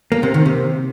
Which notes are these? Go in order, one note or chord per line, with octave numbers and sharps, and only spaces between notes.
A#3
C3
D#3
C3